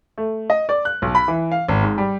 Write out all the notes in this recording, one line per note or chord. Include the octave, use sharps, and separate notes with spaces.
A3
D#5
D5
F#6
B1
B5
E3
F5
G#1
G#2
G3